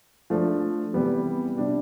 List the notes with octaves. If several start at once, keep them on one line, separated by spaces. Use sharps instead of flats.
F3 A3 D4
E2 C3 G3 B3
C3 G3 D4 G4